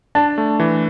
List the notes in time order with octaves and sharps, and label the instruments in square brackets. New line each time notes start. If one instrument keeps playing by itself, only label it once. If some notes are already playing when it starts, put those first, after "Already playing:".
[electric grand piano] D4 [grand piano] A5
[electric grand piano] A3
E3